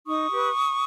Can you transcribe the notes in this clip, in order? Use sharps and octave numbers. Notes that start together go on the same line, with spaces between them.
D#4 C#6 D#6
G4 B4